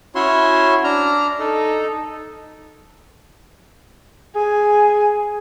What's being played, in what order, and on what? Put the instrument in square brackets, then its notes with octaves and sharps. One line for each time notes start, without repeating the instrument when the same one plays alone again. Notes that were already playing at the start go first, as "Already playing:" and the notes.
[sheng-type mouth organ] C#4 E4 F#4 C#5 E5 C6
D4 A#5 F6
D#4 A4
[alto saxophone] G#4 [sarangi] G#5